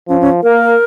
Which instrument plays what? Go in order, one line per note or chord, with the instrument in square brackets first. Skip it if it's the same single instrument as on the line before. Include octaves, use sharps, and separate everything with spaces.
[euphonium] F3 [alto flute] C#4
[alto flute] C#4
[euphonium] A#3 [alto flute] A#4